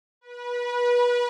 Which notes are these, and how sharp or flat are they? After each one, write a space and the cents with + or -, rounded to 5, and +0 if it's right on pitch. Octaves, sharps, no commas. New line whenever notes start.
B4 -25